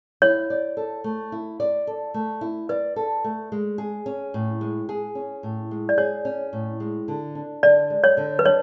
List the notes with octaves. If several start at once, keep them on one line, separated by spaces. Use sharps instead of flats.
E4 C#5
D5
A4
A3
E4
D5
A4
A3
E4
B4 D5
A4
A3
G#3
G#4
C#4
A2
G#3
G#4
C#4
A2
G#3
D5
G#4 C#5
C#4
A2
G#3
D3
D4
D3 D5
G#3
C#5
D3
B4
D4 C#5